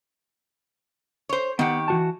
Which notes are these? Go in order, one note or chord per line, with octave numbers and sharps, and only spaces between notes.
C5 C#5
D#3 B3 G4 F#5
E3 F#4 A5